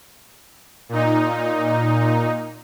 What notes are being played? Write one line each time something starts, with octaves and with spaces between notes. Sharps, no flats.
A#2 D#4